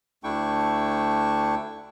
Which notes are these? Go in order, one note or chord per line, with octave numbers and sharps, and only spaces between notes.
D2 A3 D4 E4 G5 C#6